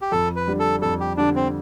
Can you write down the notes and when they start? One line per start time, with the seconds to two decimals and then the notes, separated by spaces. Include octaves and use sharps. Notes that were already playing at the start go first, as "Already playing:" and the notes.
0.02 G4
0.12 F2 A4
0.36 B4
0.47 D3 G3
0.59 A4
0.82 F2 A4
1.00 G4
1.17 D3 G3 D4
1.36 C4